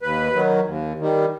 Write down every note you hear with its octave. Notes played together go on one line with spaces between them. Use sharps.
D#2 B4
D#3 F#3
D#2
D#3 G3